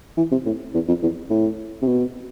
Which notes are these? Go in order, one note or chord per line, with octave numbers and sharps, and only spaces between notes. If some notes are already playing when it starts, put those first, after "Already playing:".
E3
C3
A2
E2
F2
E2
A2
C3
B2